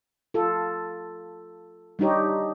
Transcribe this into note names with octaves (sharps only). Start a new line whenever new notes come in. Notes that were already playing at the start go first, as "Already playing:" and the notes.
F4 A4
G3 D4 D#4 G4 C#5